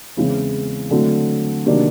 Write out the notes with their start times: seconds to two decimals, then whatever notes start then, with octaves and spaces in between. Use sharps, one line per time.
0.17 E2 C#3 E3 G#3 C4
0.91 D3 F#3 A3 C4
1.66 C3 D#3 F#3 A#3 D4